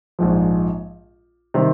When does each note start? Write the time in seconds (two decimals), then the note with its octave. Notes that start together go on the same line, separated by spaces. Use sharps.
0.19 A#1 G#2 F3
1.54 C3 D#3 G3 C4